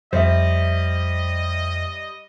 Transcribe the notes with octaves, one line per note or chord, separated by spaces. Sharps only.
F2 G3 C5 D#5 E5